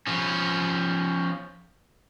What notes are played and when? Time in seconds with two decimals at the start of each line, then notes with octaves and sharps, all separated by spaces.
0.07 F3 C#4